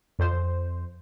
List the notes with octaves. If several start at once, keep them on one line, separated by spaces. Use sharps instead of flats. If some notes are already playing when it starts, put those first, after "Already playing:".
F2 C5